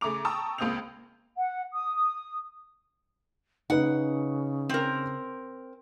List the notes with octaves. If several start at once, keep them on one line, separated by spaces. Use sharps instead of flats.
C#3 A3 A#5 D6 F7
G5 A5 A#5 C#6 D#6 E6
C#2 A#3 C4 D#6 G6 F7
F#5
D#6
C#3 D#4 B4 F#5
C4 A#4